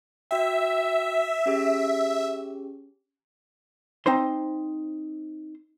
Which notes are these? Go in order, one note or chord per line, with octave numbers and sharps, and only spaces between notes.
F#4 E5 G5
C#4 G4 G#4
C4 D#4 C5 C6